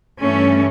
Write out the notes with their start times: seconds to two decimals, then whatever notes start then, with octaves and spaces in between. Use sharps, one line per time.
0.21 G2 E3 A3 C#4